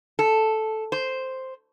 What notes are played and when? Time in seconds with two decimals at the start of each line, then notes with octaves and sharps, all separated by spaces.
0.19 A4
0.92 C5